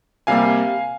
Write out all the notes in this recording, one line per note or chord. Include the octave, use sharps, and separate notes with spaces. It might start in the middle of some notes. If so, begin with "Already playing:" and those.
C3 G3 A#3 F5 G#5